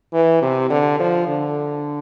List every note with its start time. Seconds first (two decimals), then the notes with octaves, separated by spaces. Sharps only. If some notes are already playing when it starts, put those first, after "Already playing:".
0.13 E3
0.42 C3
0.70 D3
0.99 F3
1.28 D3